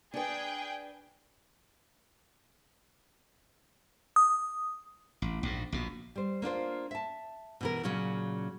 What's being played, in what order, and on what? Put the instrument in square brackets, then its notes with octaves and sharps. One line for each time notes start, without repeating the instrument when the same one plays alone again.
[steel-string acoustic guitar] D4 B4 [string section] G#4 G5
[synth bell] D#6
[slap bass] A1
A#1 G#2
A#1 B2
[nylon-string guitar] G3 C5
A#3 D4 F4 C5
E5 A5
B2 E3 A#4
A#2 C#3 F#3 C#4